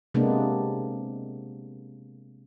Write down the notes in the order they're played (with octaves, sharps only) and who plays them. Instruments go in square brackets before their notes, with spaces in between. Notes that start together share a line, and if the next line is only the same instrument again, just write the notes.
[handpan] C3 G#3 A#3 B3 D4